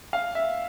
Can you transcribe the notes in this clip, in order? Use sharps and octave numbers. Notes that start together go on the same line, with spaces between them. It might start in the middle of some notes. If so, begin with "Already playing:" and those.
F5
E5